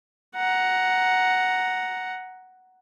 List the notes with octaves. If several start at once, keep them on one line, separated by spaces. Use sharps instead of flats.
F#5 A#5